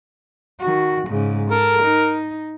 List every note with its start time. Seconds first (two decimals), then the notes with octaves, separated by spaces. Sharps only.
0.60 D#3 F#4
1.08 G#2 C#3
1.51 A4 A#4
1.82 D#4